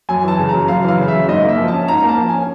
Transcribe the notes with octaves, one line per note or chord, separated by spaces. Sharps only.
F#2 G#5
E3 A5
C#3
F#2 A#5
F#2 F5
E3 F5
C#3
E5
F#2
G#2 D#5
A#3 E5
F3
C#4 A5
G#2 A#5
A#3
A5
F3
C#4 G#5